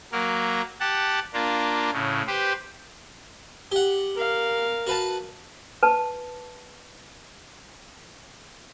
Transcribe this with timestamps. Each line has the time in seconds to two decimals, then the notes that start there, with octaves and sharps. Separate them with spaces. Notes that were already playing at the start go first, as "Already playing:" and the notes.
0.12 F#3 A#3 A#4
0.80 G4 F#5 A5
1.34 A#3 D4 F4 A#4
1.92 A2 C#3
2.27 G4 B4 C5
3.72 G4 F#5
4.16 A#4 F5
4.87 F#4 B4 A5
5.83 B4 A5